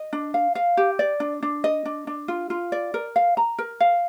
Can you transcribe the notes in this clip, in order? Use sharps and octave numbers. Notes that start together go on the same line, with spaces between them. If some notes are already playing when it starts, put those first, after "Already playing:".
Already playing: D#5
D4
F5
F5
G4
D5
D4
D4
D#5
D4
D4
F4
F4
D5
A#4
F5
A#5
A#4
F5